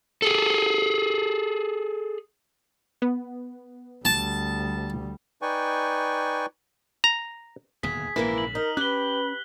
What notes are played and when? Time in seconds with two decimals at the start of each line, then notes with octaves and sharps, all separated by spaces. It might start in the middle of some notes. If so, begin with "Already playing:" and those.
0.22 G#4 A4
3.02 B3
4.05 D2 G3 A5
5.42 D#4 B4 D5 G5 G#5 C#6
7.04 A#5
7.83 D1 D#2 B2 G#4 B6
8.16 A#1 G#2 C#3 E3 A#3 E4
8.38 F#7
8.55 D#4 A#4
8.77 C#4 G4 B4 F#6 F#7 G7